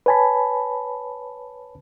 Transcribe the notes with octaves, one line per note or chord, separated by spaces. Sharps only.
B4 C#5 G#5 A5 B5